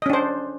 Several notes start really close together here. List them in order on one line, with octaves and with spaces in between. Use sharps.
D#5 C#4 D4 C5